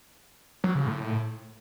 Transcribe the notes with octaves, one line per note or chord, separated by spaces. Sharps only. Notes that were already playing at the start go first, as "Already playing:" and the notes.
F#3
C#3
A2